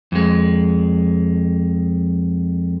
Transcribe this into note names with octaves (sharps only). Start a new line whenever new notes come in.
F2 G#3